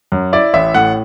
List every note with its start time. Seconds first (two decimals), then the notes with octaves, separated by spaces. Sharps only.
0.12 F#2
0.33 E4 D5
0.53 A1 E5
0.74 A2 F#5